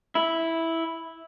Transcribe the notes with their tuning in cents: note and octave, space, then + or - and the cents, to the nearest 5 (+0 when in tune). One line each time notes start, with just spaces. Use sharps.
E4 -5